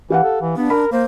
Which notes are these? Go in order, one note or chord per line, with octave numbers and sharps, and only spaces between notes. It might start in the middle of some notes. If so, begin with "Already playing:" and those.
E3 G4 F5 F#5
A4
E3
B3 D4
A#4 B5
A#3 C5